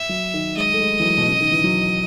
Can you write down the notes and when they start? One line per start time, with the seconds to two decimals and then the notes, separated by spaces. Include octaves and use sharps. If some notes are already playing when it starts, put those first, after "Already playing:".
Already playing: E5
0.09 F#3
0.34 D#3
0.57 G#3 D#5
0.73 A3
0.81 G#3
1.00 E3
1.04 F#3
1.17 B2
1.28 C#3
1.41 D#3
1.52 E3
1.64 F#3